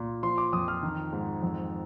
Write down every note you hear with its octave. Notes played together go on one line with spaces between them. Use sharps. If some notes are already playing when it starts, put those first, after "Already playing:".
Already playing: A#2
F3 C6
D6
F2 D#6
F6
D#3
G#2
F2